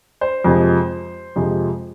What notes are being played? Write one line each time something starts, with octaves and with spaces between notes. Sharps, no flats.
C5
F2 C3 F3 G#3
F2 C3 F3 G#3